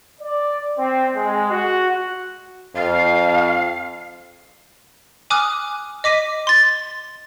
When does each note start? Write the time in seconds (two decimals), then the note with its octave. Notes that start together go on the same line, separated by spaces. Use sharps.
0.21 D5
0.78 C4
1.15 G#3
1.50 F#4
2.76 F2 F5
5.30 G#5 D6 D#6 F6 F#6
6.04 D#5 D6 B6 D#7
6.47 C6 A6